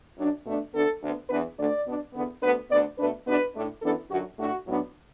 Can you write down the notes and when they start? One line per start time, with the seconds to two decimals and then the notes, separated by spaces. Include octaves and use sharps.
0.17 F#2 F#3 D4
0.45 B2 A3 D4
0.73 D2 D3 B3 D4 A4
1.01 D2 D3 B3
1.29 E2 E3 B3 D4 B4
1.58 D2 D3 A3 D4 D5
1.86 B2 B3 D4
2.14 E2 D3 B3
2.42 D2 D3 B3 D4 B4
2.70 D2 D3 B3 D5
2.98 B2 A3 D4 B4
3.26 E2 B2 B3 D4 B4
3.54 A2 A3 D4
3.82 F#2 E3 B3 D4 A4
4.10 F#2 D3 F#3 F#4
4.38 A2 A3 D4 F#4
4.66 A2 F#3 B3 D4